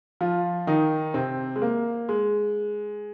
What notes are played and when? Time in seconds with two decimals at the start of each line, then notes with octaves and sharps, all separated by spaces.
0.21 F3 F4
0.67 D#3 D#4
1.14 C3 C4
1.56 G#3
1.62 A#3
2.09 G#3